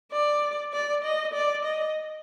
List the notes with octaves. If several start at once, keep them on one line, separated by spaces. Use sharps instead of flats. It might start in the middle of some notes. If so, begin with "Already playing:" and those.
D5
D5
D#5
D5
D#5